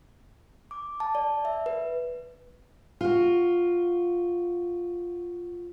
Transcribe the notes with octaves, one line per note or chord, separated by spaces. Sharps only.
D6
A5
D5
E5
B4
F4 F#4